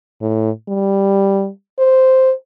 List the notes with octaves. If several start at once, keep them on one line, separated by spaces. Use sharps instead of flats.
A2
G3
C5